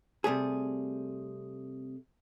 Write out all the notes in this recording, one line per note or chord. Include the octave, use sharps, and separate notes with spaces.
C3 G3 A3 G#4